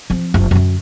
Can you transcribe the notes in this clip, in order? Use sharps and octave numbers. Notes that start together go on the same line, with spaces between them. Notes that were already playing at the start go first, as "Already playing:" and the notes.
F3 C4
F#1 F4
F#2 D3